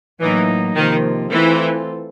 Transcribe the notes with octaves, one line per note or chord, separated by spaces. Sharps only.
A2 E3 F#3 A#3 D#4
C3 D#3 F3 A#3
E3 A3 C4 F4 A4